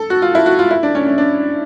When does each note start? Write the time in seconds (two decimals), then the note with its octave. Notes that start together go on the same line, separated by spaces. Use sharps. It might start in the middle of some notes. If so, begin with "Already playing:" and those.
Already playing: A4
0.10 F#4
0.22 F4
0.35 E4
0.46 F#4
0.59 F4
0.71 E4
0.83 D4
0.95 C#4
1.06 C#4
1.18 D4